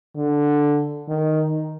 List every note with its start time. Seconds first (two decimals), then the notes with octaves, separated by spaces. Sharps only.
0.16 D3
1.09 D#3